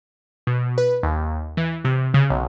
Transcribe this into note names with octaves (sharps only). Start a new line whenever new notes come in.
B2
B4
D#2
E3
C3
C#3
B1